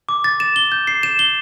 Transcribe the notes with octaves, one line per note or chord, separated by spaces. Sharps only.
D6
A6
E7
G7
G6
C7
E7
G7